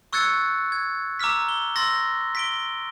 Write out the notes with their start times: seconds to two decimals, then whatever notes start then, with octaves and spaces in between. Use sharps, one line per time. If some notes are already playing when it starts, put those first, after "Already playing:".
0.13 C#6 E6 F#6 G#6 A6 C#7
0.72 G#6
1.19 A#5 D6 E6 F6 B6
1.49 G7
1.76 C6 E6 A6 A#6
2.35 B6 D7 G7